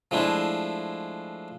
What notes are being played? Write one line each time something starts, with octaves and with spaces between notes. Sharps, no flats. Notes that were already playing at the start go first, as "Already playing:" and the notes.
F3 G#3 A3 D4 E4